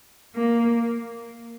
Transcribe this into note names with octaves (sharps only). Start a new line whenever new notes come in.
A#3